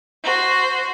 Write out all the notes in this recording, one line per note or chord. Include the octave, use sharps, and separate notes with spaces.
F#4 C5